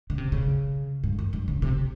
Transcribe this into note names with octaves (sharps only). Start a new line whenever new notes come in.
C#3
C3
C#3
G2
F#2
G2
C#3
C3